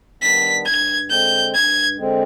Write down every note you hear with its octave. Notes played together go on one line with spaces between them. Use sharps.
D#3 G3 B3 D4 B6
G2 G#6
D3 G#3 C4 G6
G2 G#6
D3 G#3 C4